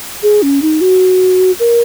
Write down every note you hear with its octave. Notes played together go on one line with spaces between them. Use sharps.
G#4
C#4
D#4
F#4
A#4